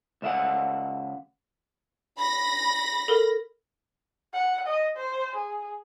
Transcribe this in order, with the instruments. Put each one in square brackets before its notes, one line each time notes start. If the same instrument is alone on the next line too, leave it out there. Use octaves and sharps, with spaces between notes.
[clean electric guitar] C#2 E5 F#5
[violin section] B5 A#6
[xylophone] A4 A#4
[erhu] F#5
D#5
C5
G#4